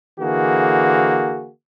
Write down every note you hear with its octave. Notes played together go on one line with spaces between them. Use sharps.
D3 E3 A#3 F#4 G#4